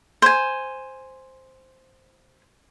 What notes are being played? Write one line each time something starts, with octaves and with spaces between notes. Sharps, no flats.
C5 G#5